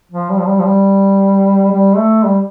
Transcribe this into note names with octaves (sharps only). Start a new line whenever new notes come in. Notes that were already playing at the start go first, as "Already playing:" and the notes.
F3
G3
F3
G3
F3
G3
G3
A3
G3